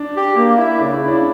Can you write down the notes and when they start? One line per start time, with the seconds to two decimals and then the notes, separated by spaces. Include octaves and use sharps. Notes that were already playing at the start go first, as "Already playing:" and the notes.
Already playing: D4
0.14 G4
0.36 A#3
0.57 E4
0.79 C#3 D4
0.94 C#4
1.01 E4
1.08 D4